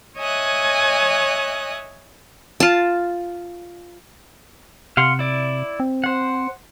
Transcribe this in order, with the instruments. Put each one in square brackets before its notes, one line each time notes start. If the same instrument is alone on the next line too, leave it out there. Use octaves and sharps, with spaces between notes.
[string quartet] C#5 D#5 E5 G#5 D#6 F#6
[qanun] F4 A5
[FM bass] C3 [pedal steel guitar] F5 F#5 C6
[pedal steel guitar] E4 D5
[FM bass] C4
[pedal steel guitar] C5 F#5